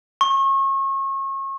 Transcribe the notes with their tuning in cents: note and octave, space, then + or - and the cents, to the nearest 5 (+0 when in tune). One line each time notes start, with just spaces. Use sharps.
C#6 -35